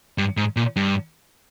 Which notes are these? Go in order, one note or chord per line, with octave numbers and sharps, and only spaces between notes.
G2
G#2
A#2
G2